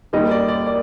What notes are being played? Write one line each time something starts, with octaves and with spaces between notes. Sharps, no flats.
D#2 D#3 G3 D#5
D5
D5
D5